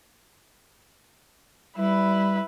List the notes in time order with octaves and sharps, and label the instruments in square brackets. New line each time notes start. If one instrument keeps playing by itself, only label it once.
[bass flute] G3 [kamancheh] E4 B4